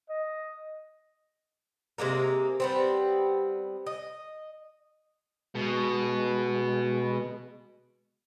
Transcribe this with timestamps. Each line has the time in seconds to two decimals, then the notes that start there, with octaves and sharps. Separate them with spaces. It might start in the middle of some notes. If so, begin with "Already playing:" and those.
0.09 D#5
1.98 C3 G#3 A#3 A#4
2.60 G3 B3 C4
3.86 D#5
5.55 B2 G#3